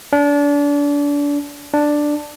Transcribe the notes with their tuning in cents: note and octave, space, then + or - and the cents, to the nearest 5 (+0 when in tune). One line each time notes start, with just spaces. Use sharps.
D4 -30
D4 +5